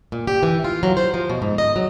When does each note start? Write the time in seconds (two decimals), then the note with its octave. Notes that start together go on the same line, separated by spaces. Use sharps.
0.12 A#2
0.27 G4
0.43 E3
0.64 F4
0.83 F#3
0.97 C5
1.14 F3
1.30 B2
1.42 G#2
1.58 D#5
1.76 F#3